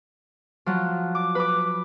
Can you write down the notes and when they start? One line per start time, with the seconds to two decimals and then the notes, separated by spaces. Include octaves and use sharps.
0.66 F3 F#3
1.15 D6
1.35 B4 D6